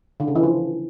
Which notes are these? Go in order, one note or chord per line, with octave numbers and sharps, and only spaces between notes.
D3
C#3
E3
F3